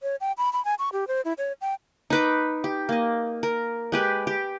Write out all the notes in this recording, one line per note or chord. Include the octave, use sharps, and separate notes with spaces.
C#5
G5
B5
B5
G#5
C#6
G4
C5
E4
C#5
G5
D#4 B4 D6
G4
A#3 D#5
A#4
G#3 G4 B4
G4